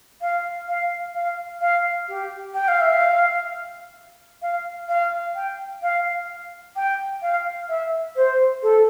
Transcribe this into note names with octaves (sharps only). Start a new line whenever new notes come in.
F5
F5
F5
F5
G4
G5
F5
E5
F5
F5
F5
G5
F5
G5
F5
E5
C5
A4